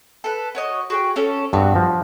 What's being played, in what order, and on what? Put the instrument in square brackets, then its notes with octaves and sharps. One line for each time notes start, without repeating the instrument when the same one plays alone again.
[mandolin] A4 B4
F#4 C#5 D#5
F#4 G#4 G5
C#4 A4 C#5
[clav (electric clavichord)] G2 [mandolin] B3 C4 F#4
[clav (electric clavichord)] F3